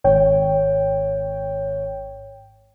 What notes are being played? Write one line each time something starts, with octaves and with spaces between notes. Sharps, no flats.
G#1 C#5 G5